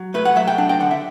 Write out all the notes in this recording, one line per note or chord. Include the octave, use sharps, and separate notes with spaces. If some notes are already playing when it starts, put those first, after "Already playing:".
Already playing: F#3
A3 B4
F#5
F#3 E5
G5
D4
G5
D3 F#5
E5